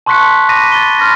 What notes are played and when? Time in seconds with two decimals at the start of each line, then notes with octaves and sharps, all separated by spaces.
0.06 A5 C6 C#6 F#6 B6 C#7
0.49 B5 D6 A#6 B6 D#7
0.72 A6 G7
0.99 B5 C6 F6 A6 A#6